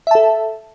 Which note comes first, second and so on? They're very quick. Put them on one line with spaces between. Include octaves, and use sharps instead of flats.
E5 A5 A4